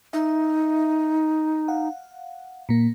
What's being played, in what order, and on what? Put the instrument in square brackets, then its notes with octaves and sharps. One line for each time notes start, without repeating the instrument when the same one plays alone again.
[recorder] D#4 [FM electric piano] E5
[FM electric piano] F5 F#5
A#2 A#3